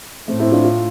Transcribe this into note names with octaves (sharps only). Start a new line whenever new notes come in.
A2 A3 C4
C4 E4
D4 F4
F4